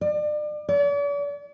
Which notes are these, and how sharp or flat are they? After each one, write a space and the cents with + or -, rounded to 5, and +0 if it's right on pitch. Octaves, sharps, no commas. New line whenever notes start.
D5 +35
D5 -45